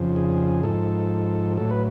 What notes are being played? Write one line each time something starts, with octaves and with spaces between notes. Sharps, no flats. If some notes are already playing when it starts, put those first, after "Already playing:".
Already playing: F2 C#3 F3
G#4
G#2 F3 A4
A2 F#3 A4
B4